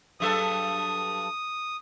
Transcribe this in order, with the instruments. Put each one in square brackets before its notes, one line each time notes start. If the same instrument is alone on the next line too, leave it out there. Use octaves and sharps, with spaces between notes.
[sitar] G2 F#3 A4 [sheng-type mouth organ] D#6